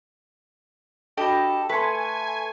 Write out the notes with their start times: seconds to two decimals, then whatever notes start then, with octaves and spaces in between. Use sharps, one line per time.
1.17 D4 F#4 G4 A4 D#5 B5
1.69 A3 B4 G#5 C6 B6 C#7